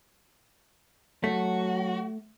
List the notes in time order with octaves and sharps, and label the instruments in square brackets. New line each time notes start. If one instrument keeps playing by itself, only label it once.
[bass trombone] F#3 [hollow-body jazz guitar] A3 [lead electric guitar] F#4